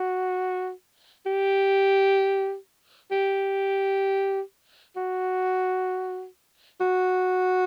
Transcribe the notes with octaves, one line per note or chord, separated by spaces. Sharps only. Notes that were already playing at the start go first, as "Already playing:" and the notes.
Already playing: F#4
G4
G4
F#4
F#4